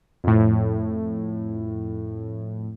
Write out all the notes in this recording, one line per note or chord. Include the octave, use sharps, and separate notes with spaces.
F2 A2